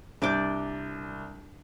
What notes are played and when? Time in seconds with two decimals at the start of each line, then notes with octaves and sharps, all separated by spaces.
0.22 C2 D4 D5 D6 G6